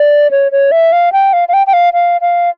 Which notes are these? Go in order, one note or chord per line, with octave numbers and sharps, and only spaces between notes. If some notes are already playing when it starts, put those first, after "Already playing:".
Already playing: D5
C#5
C#5
E5
F5
G5
F5
F5
G5
G5
F5
F5
F5